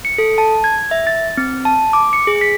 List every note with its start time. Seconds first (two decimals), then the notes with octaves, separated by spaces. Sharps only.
0.05 C#7
0.18 A4
0.38 A5
0.64 G#6
0.91 E5
1.07 A6
1.37 C4
1.65 A5
1.93 D6
2.13 C#7
2.27 G#4
2.41 B6